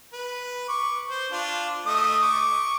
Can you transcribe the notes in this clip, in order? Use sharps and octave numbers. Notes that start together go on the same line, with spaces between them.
B4
C#6 D6
C5
D4 F4
A3 D#5 D#6
C#6 D6